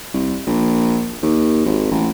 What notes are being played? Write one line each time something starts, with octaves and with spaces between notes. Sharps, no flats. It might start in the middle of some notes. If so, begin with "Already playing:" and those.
C2
A#1
D#2
G#1
A1